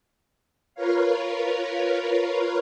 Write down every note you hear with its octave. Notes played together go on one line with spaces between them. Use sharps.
F4 A#4 B4 C#5 F5